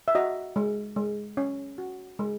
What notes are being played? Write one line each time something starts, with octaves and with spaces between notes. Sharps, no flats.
E5
F#4 D#5
G#3
G#3
C#4
F#4
G#3